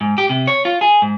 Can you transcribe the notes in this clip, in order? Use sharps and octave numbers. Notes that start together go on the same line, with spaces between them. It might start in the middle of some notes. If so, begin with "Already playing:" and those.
G#2
G4
C3
C#5
F4
G#4
G#2